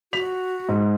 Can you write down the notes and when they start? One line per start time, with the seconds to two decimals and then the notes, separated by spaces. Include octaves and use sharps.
0.13 F#4 B6 F7
0.69 G#2